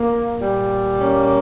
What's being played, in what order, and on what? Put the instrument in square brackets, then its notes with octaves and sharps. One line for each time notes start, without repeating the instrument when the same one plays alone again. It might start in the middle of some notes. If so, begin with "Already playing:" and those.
Already playing: [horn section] A#3
A#2 G3
A#3 C#4